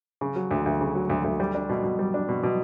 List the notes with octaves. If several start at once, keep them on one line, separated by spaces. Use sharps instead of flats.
C#3
F#3
D2
D2
C#3
F#3
D2
D2
G3
D4
B2
B2
G3
D4
B2
B2